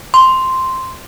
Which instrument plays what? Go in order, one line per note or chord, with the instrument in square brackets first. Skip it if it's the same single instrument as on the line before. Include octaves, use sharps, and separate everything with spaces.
[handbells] C6